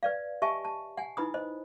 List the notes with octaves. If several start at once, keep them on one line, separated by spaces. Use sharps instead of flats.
B4 D5 F5
G4 D#5 E5 G#5 A5 C#6
A5
F#5 G#5
D#4 E4 B4 B5 D#6
C5 D#5